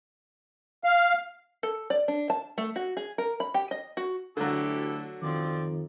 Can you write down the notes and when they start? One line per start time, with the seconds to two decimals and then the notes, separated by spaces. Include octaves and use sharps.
0.84 F5
1.63 A4
1.90 D5
2.08 D4
2.30 A5
2.58 A3
2.76 F#4
2.97 G#4
3.18 A#4
3.40 B5
3.54 G4
3.71 D#5
3.97 F#4
4.37 D2 D3 F#3 E4 G4 A4
5.22 F2 D#3 F3 C4 D5